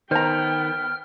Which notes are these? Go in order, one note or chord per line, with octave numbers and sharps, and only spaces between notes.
D#3 B3 C5 G5 A#5 F6